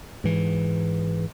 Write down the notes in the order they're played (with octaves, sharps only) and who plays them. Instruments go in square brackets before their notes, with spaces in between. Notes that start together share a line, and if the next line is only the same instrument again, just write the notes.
[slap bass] G#2 E3